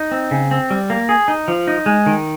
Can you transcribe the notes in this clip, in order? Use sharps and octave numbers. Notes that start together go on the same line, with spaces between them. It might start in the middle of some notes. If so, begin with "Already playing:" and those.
Already playing: D#4
C4
C#3
C4
G3
A#3
G#4
D#4
F3
D#4
G#3
D#3